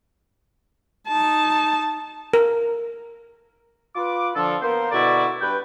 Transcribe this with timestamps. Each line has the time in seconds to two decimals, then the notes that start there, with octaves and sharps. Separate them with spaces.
1.07 D#4 A5
2.34 A#4
3.96 F4 B4 D6
4.35 D3 F3 A4
4.62 A#3 B3 A#4 C5
4.91 B2 D3 E4 F#4 D5
5.41 G2 B4 G5